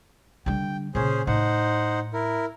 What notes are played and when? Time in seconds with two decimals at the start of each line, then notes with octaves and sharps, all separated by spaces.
0.46 D3 G3 G5
0.95 A#2 C#3 C#4 G#4 C5
1.27 A2 D#4 C5 F#5
2.14 E4 A#4